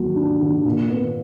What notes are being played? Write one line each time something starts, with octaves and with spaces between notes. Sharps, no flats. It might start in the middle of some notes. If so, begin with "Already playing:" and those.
Already playing: D#2 F#3
D4
D3
A#2
B3